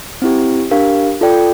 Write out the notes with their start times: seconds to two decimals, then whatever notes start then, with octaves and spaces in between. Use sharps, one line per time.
0.22 C4 E4 G4
0.71 D4 G4 A#4 F5
1.21 F4 A4 D5 G5